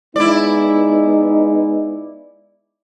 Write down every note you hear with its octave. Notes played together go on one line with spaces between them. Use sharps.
G#3 B3 D#4 E4 D5